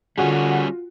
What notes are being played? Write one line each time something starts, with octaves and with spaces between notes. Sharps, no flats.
D3 G3 C#4 F4 F#4 G#4